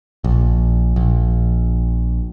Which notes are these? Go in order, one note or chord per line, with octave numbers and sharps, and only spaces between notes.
A#1
A#1